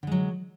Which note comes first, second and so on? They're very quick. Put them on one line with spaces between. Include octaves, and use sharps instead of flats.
D3 G#3 F#3